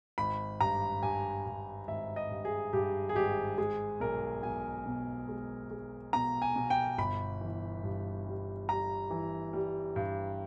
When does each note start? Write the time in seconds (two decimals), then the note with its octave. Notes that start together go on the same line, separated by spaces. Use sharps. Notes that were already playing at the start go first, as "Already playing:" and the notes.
0.18 G#1 B5
0.60 G2 A#5
1.03 G2 G#5
1.46 G2
1.88 G#1 E5
2.16 D#5
2.30 G2
2.45 G#4
2.73 G2 G4
3.09 G#4
3.15 G#1 G4
3.58 G#3 G#4
4.00 B1 A#4
4.43 B1 G#5
4.86 B2
5.29 G#3
5.70 G#3
6.13 B2 A#5
6.42 G#5
6.56 B2
6.70 G5
6.98 G1 B5
7.41 E3
7.84 G2
8.26 G3
8.69 G3 A#5
9.10 E3
9.53 G3
9.96 G2